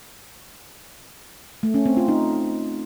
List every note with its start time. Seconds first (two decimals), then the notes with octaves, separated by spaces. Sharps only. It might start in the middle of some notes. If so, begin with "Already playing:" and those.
1.63 A3
1.74 C#4
1.86 C4
1.97 F4
2.08 D#4